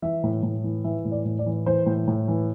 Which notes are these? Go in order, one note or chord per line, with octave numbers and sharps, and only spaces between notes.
E3 E5
A2
A2
E3
E3 E5
A2
D5
A2
D5
E3
E3 C5
A2
A2
E3